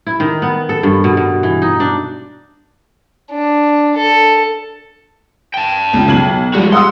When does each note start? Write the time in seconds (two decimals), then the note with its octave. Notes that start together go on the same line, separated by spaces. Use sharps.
0.07 E4
0.20 D#3
0.42 B3
0.69 A4
0.83 G2
1.04 B2
1.17 B2
1.43 E3
1.62 D#4
1.80 D4
3.32 D4
3.96 A4
5.54 G5 A5
5.93 C#2
6.08 B1 G#6 F#7
6.54 F3 G3 G#3 F#4
6.72 F#5 C6 D#6 E6